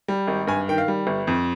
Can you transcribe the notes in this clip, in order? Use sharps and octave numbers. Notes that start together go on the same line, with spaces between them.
G3
G#1
G2 G#5
D#3 G5
F5
G3
G1
F2